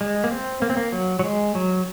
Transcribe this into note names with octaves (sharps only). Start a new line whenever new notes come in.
G#3
A#3
C4
A#3
C4
A#3
F#3
F#3
G#3
F#3